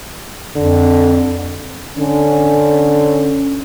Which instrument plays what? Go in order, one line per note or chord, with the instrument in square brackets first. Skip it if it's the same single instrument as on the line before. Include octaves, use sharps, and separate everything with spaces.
[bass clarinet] F2 [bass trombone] D3
[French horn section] D3 C#4